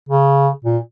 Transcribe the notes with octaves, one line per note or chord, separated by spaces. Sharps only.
C#3
A#2